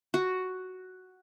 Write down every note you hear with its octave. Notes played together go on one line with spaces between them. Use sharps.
F#4